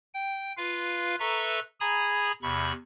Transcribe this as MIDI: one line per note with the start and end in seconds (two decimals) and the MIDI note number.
0.14 0.52 79
0.57 1.16 65
0.57 1.16 71
0.57 1.16 77
1.20 1.60 69
1.20 1.60 71
1.20 1.60 76
1.20 1.60 82
1.20 1.60 85
1.80 2.32 68
1.80 2.32 80
1.80 2.32 82
1.80 2.32 83
1.80 2.32 87
1.80 2.32 92
2.43 2.72 40
2.43 2.72 48
2.43 2.72 83
2.43 2.72 85